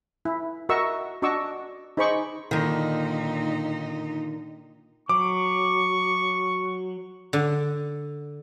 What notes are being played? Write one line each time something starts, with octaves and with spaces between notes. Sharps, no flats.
E4
F#4 A#4 D#5 E5 C#6 E6
D4 F#4 D#5 C#6 D6 E6
D#4 G#4 C5 B5 C#6 D6
A#2 D3 D#3 D#4
F#3 C#6 D6
D3